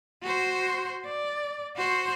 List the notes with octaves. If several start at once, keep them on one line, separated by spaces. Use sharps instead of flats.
F#4 C5
D5
F#4 C5